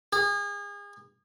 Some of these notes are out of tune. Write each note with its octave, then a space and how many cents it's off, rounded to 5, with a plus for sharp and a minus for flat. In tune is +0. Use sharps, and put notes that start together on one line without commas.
G#4 -35